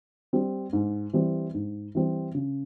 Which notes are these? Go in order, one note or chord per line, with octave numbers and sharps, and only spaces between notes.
G3 C4
G#2
E3 G3 C4
G#2
E3 G3 C4
C#3